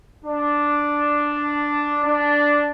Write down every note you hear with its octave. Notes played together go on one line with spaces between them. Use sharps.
D4
D4